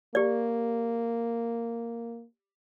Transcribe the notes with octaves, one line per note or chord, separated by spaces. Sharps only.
A#3 G4 D5